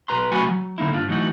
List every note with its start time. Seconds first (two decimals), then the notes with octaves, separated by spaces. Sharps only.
0.08 B1 B4 A#5 C6
0.32 C3 F#3 A3 F#4 G#5 B5
0.48 F#3
0.78 D3 A#3 D#4 E4
0.93 G2 D4 F4
1.09 E3 F#3 A3 D#4 F#4